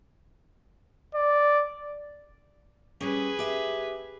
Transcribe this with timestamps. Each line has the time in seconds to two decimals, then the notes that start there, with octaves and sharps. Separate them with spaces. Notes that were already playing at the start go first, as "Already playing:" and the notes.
1.15 D5
3.01 G3 C#4 G#4 B4
3.39 G4 E5